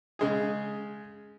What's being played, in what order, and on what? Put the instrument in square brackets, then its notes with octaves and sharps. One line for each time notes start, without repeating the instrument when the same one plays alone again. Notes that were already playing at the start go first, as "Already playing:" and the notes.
[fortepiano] C#3 G#3 G#4